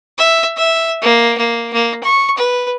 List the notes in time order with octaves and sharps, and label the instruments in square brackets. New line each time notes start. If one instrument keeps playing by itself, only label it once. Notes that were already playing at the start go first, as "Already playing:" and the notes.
[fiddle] E5
E5
A#3
A#3
A#3
C#6
B4